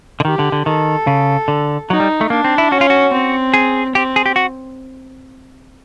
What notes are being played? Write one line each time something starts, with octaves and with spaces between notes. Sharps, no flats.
D3
D#3 G4
D3
D3
D#3 A4
C#3
D3
F#3 D#4
G3
A3
A#3 D4
C4
E4
C#4 F#4
F4
F#4
C4
G#4
C4 G4
G#4
G4
F#4